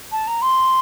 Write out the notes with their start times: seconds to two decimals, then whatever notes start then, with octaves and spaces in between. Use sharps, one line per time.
0.11 A5
0.27 A#5
0.41 C6